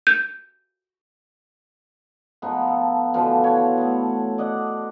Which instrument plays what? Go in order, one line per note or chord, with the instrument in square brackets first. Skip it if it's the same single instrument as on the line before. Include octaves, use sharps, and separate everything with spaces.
[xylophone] G6
[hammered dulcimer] F3 G#3 B3 D#4
A4
B2 D3 E3 F3
C#5 F#5
A3 B3
D5 D#5 F#5